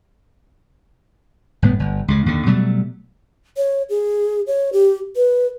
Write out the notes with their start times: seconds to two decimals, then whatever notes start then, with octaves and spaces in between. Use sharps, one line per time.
1.62 G1 A2 B3
1.79 G1
2.08 C#2 C#3
2.26 D#2 D3
2.46 B2 F#3 G3 A3
3.57 C#5
3.89 G#4
4.47 C#5
4.73 G4
5.16 B4